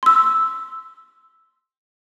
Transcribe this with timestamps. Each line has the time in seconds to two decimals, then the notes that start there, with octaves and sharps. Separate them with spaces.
0.03 C6 E6